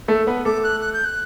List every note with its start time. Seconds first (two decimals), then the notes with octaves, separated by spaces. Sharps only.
0.08 A3 A4
0.27 B3 B4
0.45 A3 A4 D6
0.64 F#6
0.81 F#6
0.93 G6
1.05 F#6